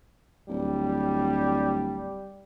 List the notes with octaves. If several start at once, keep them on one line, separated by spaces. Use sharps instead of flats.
D1 G3